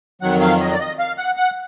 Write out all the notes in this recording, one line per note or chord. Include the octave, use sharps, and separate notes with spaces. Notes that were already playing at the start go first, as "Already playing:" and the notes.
F2 D#3 F#3 F#5
F5
D#5
D5
D#5
F5
F#5
F#5